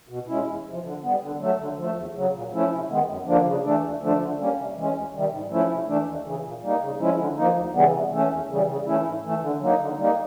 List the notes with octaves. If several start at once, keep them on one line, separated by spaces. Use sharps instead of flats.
B2
G#3 C#4 E4
E2
C3 F3
D3
G3 B3
D3
F#3 A3
D3
F3 A3
E2
C#3 F#3
A#2
F3 A3 C#4 E4
C3
D#3 G#3 B3
F#2
D3 F3 A#3 D4
C#3
E3 A3 D4
D2
D3 F3 A3 D4
D3
G3 A#3 C#4
C3
E3 G#3 C#4
D2
C3 D#3 G3
G#2
F3 A3 C#4 E4
C3
E3 A3 D4
D#2
C#3 E3
A#2
G3 A#3 D#4
C#3
F3 G#3 C#4 E4
D3
F3 A#3 D#4
D2
C#3 E3 G3 B3
C3
E3 A3 C#4
E2
C#3 E3 G3
C#3
E3 A3 C#4 E4
G#2
E3 A3
D3
F#3 A#3 D#4
D3
G3 A#3 D#4